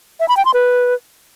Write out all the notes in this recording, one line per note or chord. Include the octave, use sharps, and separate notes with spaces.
E5
B5
G5
C6
B4